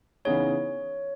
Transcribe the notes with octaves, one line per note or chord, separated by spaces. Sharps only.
C#3 E3 B3 D#4 G#4 C#5